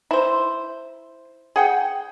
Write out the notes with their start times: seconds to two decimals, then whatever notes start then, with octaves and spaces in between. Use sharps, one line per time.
0.11 E4 C5
1.56 G#4 F#5 G5